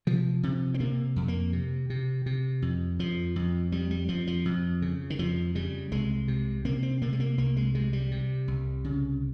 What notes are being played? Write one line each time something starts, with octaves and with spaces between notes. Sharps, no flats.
C3 F3
C3
C4
C3 A#3
F2
A#3
C3
C3
C3
F2
F2 F3
F2
F2 G3
G3
F2 F3
F3
F2
C#3
D#3
F2 F3
C#3 G3
C2 G#3
C3
C3 A#3
C4
C3 A#3
G#3
A#3
C2 A#3
G#3
C3 G#3
G3
C3
C2
C#3